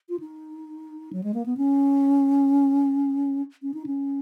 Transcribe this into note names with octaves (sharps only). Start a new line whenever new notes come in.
F4
D#4
F#3
G#3
A#3
B3
C#4
C#4
D#4
C#4